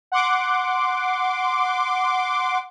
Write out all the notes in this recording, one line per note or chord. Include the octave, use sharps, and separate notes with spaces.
F#5 C6 D6